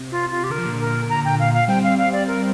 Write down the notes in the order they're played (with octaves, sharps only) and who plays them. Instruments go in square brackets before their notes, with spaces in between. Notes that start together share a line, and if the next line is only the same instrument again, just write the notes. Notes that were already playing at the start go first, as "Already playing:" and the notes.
Already playing: [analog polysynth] C3
[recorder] F4
F4
G4
[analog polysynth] D3 [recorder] A#4
[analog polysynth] F3
A#2 D3
[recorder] A#4
A#5
G5
F5
F5
[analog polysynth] G3 C4 [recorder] G5
[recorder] F5
F5
D5
A#4